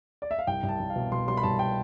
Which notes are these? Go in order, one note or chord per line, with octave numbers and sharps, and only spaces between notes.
D5
E5
F5
C2 G5
C2
A5
C2
F5
B2
B2 C6
G3 C6
B5
C2 A5
G5